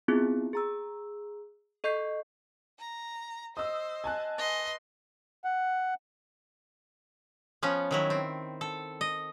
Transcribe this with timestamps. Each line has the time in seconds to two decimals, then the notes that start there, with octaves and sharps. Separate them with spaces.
0.08 B3 C4 E4 F4 G#4
0.53 G#4 A#5 E6
1.84 A4 D#5 C#6 G6 C7
2.79 A#5
3.57 C5 D#5 D#6 E6
4.04 G#5 A5 F#6
4.38 B4 D#5 C6
5.45 F#5
7.63 F3 B3 C#4
7.91 D#3 F#3 E4
8.10 C4
8.61 A4
9.01 D#5